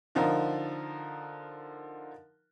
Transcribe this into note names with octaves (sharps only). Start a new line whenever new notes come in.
D3 F3 D#4 F4 A#4